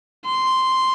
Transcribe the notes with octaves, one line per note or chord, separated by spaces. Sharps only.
C6